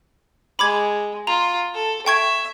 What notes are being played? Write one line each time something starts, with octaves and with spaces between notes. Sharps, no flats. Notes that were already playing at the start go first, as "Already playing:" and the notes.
G#3 B5 D6 G#6
F4 A#5
A4
E5 G5 C#6 G#6